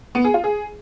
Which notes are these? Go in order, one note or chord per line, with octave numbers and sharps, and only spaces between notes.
B3
G#4
F4
G#4